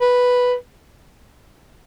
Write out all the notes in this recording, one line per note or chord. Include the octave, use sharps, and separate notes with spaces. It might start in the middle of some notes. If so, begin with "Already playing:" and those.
B4